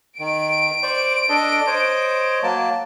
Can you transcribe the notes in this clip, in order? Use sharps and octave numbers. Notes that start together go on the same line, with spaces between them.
D#3 D7
C5 D5 C#6
D4 A4 D#5
C5 C#5 D#5
F#3 A#3 A5